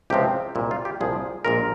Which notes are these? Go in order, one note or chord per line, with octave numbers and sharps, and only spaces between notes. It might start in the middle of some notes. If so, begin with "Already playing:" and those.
C#2 C3 F3 C4 G4
C2 A#2 G#3 E4
F4
G4
C2 A#2 F3 G#4
A#1 A#2 G#3 A#4